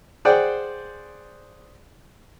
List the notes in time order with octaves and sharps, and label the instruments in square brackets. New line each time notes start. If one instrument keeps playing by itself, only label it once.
[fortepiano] G#4 C5 D5 F#5 G5